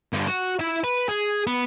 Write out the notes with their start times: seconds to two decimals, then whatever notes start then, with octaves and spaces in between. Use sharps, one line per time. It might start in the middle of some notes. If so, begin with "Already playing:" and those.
0.13 G2 D3
0.27 F#4
0.60 E4 E5
0.84 B4
1.09 G#4
1.47 B3